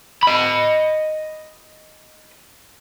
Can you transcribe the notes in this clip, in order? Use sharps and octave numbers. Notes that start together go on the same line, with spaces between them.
D#5 B5